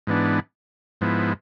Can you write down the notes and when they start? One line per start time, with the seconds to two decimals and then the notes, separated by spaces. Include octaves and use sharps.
0.07 G#2 E3 B3 D4
1.01 G#2 F3 B3 E4